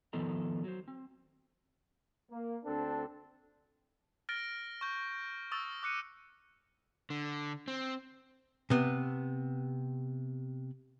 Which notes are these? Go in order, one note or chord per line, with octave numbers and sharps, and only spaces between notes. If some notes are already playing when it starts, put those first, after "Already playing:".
D#3 F3 B3 A4 D#5 A#5
F#3 C5
C4
A#3
D2 C4 D4 A4
F6 A6 A#6 D7 G7
C#6 G6
C#6 D#6 E6 A6
D6 F#6 C#7 D#7
D3
C4
C3 B3